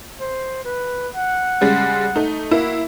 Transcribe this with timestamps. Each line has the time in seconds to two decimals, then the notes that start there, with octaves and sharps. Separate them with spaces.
0.19 C5
0.64 B4
1.15 F#5
1.61 C#3 G3 G#3
2.16 A3 D#4
2.51 A#3 E4 F#4